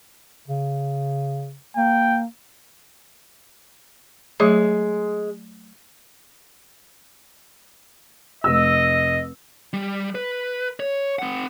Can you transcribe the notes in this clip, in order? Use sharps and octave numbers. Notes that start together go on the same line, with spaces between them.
C#3
A#3 G5
F#3 G#3 A3 C#5
F1 D#5 E6
G3
B4
C#5
C4 F#5